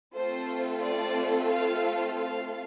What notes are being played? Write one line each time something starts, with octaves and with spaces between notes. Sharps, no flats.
A3 C4 F4 A4 C5
D5
F5
F5